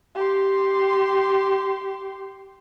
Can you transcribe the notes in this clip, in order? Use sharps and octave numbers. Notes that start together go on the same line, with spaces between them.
G4 C6